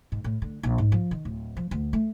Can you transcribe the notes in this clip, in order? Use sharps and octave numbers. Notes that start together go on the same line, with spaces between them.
G#2
A2
D3
A#1
G#2
F3
D#3
D1
F3
D2
A3